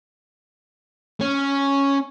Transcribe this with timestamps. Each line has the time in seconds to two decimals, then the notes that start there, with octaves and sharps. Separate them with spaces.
1.21 C#4